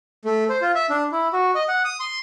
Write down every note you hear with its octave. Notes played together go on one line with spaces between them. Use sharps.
A3
C5
F4
E5
D4
E4
F#4
D#5
F#5
D#6
C6